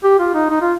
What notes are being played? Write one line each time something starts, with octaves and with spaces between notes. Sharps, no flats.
G4
F4
D#4
D#4
F4